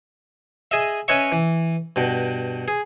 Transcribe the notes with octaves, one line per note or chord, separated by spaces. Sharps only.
G#4 D#5 E5
C#4 B4 C#5 D#5 E5 C#6
E3
G2 B2
G#4